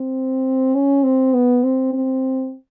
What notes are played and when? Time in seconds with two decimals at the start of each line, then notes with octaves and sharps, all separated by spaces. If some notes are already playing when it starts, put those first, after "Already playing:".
Already playing: C4
0.75 C#4
1.04 C4
1.34 B3
1.64 C4
1.93 C4